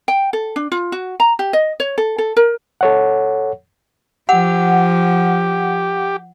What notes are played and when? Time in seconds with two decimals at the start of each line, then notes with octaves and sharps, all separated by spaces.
0.08 G5
0.33 A4
0.56 D4
0.72 F4
0.92 F#4
1.20 A#5
1.39 G4
1.53 D#5
1.80 C#5
1.98 A4
2.18 A4
2.36 A#4
2.81 A4 C#5 F#5
4.29 F3 G4 F#5